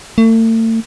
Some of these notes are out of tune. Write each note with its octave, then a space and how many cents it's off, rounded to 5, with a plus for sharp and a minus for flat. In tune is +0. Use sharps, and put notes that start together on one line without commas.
A3 +40